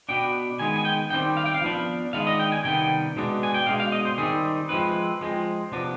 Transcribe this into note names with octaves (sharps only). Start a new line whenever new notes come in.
B2 B3 D4 G5
D#3 G#3 B3 G#5
G#5
G5
D#3 G3 C4 G5
F5
G5
F5
F3 B3 D4
D#3 G#3 B3 D4 F5
D#5
G5
G#5
C3 D#3 G3 B3 G5
B2 G#3 B3 D4
G#5
G5
B2 G#3 D4 F5
F5
D#5
C5
D#3 G3 C4 G#4
F3 G#3 C4 B4
F3 G#3 C4
C3 F3 B3 D4